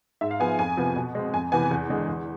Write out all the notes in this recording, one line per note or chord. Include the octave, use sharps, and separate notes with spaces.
G#2 E5
F5
F3 B3 G#5
F2 G#5
C3 F3 B3
B2
G#3 C4
F2 G#5
C3 E3 B3 G#5
E2
D3 G#3
E2